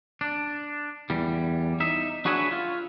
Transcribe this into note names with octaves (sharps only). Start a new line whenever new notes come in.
D4
E2 G3
D#4 E5
D4 F#4 G#4 B4 C#5 E5
F4